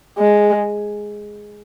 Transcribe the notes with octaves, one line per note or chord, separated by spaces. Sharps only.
G#3